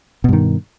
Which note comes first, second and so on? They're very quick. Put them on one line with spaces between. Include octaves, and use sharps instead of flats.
B2 G2 D#3